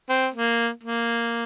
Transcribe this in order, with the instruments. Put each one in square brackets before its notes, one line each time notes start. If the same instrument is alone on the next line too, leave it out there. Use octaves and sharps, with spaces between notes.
[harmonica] C4
A#3
A#3